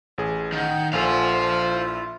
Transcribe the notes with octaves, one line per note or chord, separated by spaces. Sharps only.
A1 G#4
D#3 F#5 G6 G#6
A#1 F4 A4 C5 F5 F#5 G#5
A5
E4